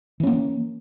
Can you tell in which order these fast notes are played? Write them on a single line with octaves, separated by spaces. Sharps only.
E3 C#4 A#3